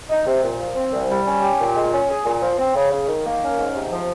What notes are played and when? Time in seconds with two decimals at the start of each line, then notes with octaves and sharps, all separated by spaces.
0.10 D#4
0.26 C3
0.43 A#2
0.59 F3
0.76 C4
0.92 C2
1.09 G3
1.25 C#4
1.42 G4
1.59 A#2
1.75 G#3
1.92 C#4
2.08 G#4
2.25 A#2
2.42 F3
2.58 C4
2.75 C#3
2.92 C#3
3.08 D#3
3.25 A#3
3.41 C#4
3.58 G#2
3.75 C3
3.91 F3